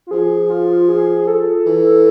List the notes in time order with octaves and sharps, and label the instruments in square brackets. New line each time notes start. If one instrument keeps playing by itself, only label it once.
[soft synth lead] F4
[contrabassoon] F3 [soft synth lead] G#4
[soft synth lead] F4
G#4
A4
[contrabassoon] E3